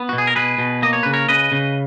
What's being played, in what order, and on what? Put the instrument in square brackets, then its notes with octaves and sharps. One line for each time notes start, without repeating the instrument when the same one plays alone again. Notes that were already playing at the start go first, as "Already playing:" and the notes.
Already playing: [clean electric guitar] B3
F#4
B2
G#4
A#4
B2 G#4 B4
B2
A#3 D#5
C#5
C#3 B4
A#4 C#5
C#3 B4 D#5
C#3